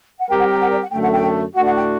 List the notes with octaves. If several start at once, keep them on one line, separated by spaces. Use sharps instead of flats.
F#5
G3 C4 G4 A#4 G5
F#5
G5
F#5
D5
F#5
F#2 D3 A3 G5
F#5
G5
A2 A3 D4 F#4 F#5
F#5
G5